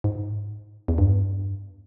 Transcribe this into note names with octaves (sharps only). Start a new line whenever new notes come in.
G#2
E2
G2